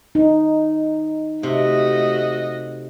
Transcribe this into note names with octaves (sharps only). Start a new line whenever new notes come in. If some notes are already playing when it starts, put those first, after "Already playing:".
D#4
C3 A3 F#4 D#5